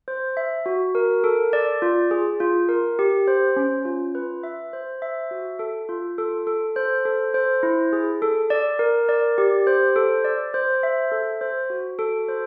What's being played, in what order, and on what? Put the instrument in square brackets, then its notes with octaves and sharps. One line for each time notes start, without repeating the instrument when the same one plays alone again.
[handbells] C5
E5
F#4
A#4
A4
D5
F4
G#4
F4
A#4
G4
C5
C#4
F4
B4
E5
C5
E5
F#4
A4
F4
A4
A4
C5
A4
C5
E4
G#4
A4
D5
A#4
D5
G4
C5
A4
D5
C5
E5
A4
C5
F#4
A4
C5